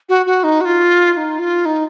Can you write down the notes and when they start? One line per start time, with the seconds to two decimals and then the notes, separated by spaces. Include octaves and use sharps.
0.09 F#4
0.26 F#4
0.44 D#4
0.61 F#4
0.65 F4
1.13 F4
1.17 D#4
1.39 F4
1.65 D#4